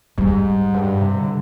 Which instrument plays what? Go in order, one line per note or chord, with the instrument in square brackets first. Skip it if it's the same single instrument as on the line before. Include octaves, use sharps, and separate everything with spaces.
[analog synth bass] G#2 [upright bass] G3
[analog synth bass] G2
C3
D3